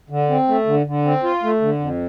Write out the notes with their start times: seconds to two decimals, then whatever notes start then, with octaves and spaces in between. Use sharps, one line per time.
0.10 D3
0.30 C4
0.48 A3
0.67 D3
0.86 D3
1.05 C4
1.24 F4
1.43 A3
1.61 D3
1.80 F2